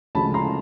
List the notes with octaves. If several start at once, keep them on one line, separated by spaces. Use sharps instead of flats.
D2 C#3 F3 G#3 A5 B5
A#5 C6